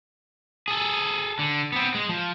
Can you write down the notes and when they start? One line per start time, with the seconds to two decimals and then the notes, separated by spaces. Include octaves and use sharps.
0.68 G#4 A4
1.39 D3
1.72 B3 C4
1.95 G#3
2.09 F3